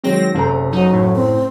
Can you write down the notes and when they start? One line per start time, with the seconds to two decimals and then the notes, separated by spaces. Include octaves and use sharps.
0.04 D#3 F#3 G#3 C4 A#6
0.35 F#1 C3 A4 A#5
0.72 F#3 D#4
0.93 A2
1.16 C4